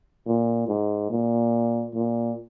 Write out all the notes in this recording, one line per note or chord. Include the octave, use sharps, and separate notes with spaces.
A#2
G#2
A#2
A#2